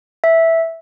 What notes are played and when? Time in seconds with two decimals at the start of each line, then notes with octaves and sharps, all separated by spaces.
0.24 E5